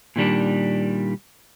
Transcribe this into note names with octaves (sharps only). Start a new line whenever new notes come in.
A#2 D#3 G3 D4